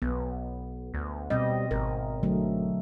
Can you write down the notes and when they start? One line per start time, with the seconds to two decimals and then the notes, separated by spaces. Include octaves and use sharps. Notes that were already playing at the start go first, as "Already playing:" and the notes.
0.02 B1 B3
0.94 D2
1.30 B2 G3 C4 D#5
1.71 G#1 A#4
2.23 D3 F#3 A3